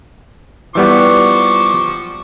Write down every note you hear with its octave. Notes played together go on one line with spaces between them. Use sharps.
E3 F3 G3 B3 C#6 D6